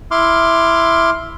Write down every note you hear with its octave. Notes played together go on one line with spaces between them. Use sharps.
E4 C6 D6 F6